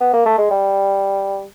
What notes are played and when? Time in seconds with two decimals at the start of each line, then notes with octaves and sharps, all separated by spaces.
0.01 B3
0.13 A#3
0.26 A3
0.38 G#3
0.51 G3